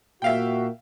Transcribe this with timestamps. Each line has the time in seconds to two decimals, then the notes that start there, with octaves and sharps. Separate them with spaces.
0.22 A#2 A#3 F#4 E5 F5 G5